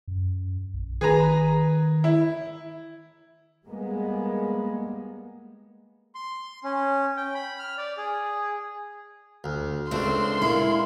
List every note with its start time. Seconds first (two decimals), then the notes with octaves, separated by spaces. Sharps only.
0.08 F#2
0.74 A#1
1.01 D#3 G#4 B4 A#5
2.04 E4
3.65 G3 G#3 A#3 B3
6.15 C6
6.64 C#4
7.17 G5
7.35 B5
7.59 F6
7.78 D5
7.98 G#4
9.44 D2
9.91 C#2 A3 C4 D4 C6
10.42 A#2 G#3 E4